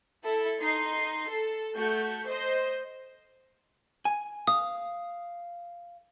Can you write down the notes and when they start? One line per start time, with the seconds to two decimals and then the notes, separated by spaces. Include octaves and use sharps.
0.24 E4 A4
0.60 D#4 C6 C7
1.29 A4
1.76 A3 F#4 C#6 G6
2.27 C5 D#5
4.05 G#5
4.47 F5 D#6